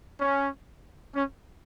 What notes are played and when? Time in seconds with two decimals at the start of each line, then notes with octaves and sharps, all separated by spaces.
0.20 C#4
1.14 C#4